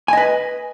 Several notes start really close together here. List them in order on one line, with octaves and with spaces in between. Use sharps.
G#5 D#5 B4